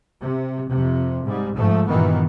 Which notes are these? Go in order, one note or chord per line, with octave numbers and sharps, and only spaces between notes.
C3
F2 C3
G#2 G3
G#2 F3 A3
G2 A#2 D#3 E3 B3